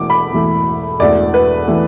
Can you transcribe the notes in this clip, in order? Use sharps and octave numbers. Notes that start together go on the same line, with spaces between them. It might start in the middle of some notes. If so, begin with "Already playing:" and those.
Already playing: E1 E2 E3 A3 D6
B5
E1 E2 E3 A3
E1 E2 E3 A3 D5
B4
E3 A3